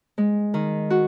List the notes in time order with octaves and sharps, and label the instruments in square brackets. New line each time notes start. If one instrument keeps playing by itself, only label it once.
[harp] G#3
D#3
F#4